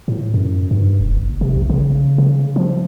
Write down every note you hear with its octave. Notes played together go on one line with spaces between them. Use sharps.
A2
F#2
G2
E1
F#1
C3
A#1
C#3
C#3
F3